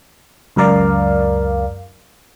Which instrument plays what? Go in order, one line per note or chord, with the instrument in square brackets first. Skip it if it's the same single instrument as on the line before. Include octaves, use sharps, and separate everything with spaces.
[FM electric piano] C#2 F#2 A#4 D5 F5